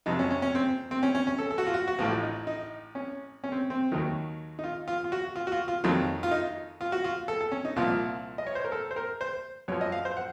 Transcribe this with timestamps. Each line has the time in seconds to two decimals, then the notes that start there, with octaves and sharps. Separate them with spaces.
0.06 F2 C3 F#3 D#4
0.19 C#4
0.31 C#4
0.42 C#4
0.55 C4
0.91 C4
1.03 C#4
1.15 C#4
1.27 C#4
1.38 A4
1.51 A4
1.58 F#4
1.67 F4
1.74 F#4
1.88 F#4
1.99 A1 A2 F3 F4
2.23 D#4
2.47 D#4
2.95 C#4
3.44 C#4
3.52 C4
3.70 C4
3.92 D#2 D#3 F#3
4.59 D#4
4.64 F4
4.88 F4
5.04 F4
5.12 F#4
5.36 F4
5.47 F#4
5.52 F4
5.68 F4
5.84 F2 D#3 F#3 C4
6.23 F4
6.31 D#4
6.81 F4
6.92 F#4
7.04 F4
7.28 A4
7.41 A4
7.52 C#4
7.65 D#4
7.76 C2 A#2 F3 F4
8.38 D#5
8.47 C#5
8.55 C5
8.64 A#4
8.72 A4
8.91 C5
8.96 A#4
9.21 C5
9.68 F#2 C#5
9.72 F3
9.81 D#5
9.92 F5
10.05 C5
10.17 F#5